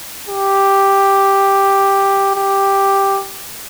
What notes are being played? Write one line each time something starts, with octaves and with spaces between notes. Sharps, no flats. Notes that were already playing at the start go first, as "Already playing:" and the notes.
G4
G4